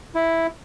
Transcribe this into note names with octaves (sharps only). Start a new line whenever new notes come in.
E4